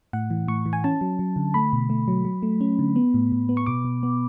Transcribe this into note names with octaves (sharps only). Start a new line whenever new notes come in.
A2 F#5
E3
A2 C#6
E3
G#5
C#4 A5
F#3
F#3
D3
A3 B5
B2
A3
F#3
F#3
A3
C#4
D3
B3
A2
A2
B3
C#6
B2 D6
B2
B3